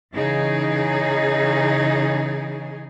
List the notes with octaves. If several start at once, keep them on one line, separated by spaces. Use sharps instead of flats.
C#3 E3 D#4 G#4